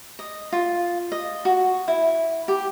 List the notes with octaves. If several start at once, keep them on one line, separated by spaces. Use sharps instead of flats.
D#5
F4
D#5
F#4
E4
G4